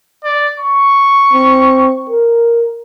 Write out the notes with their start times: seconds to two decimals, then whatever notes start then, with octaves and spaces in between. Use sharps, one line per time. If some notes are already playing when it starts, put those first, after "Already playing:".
0.24 D5
0.59 C#6
1.33 C4
2.10 A#4